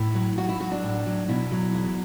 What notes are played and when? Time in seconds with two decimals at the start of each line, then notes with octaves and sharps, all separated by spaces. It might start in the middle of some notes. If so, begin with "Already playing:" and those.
Already playing: A2 E4
0.14 F#3
0.37 F#3 F#4
0.49 E4
0.60 F#3 F#4
0.71 D4
0.83 A2
1.06 F#3
1.28 B2 E4
1.52 F#3
1.74 E2 E4